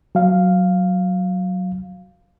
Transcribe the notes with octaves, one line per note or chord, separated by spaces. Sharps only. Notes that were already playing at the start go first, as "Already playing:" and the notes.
F#3 F5